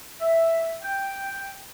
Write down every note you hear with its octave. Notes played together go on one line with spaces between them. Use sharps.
E5
G5